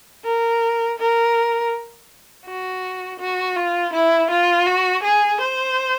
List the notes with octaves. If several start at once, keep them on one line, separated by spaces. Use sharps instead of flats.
A#4
A#4
F#4
F#4
F4
E4
F4
F#4
G#4
C5